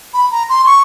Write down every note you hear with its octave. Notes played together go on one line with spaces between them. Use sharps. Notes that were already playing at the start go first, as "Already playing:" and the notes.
B5
A#5
C6
C#6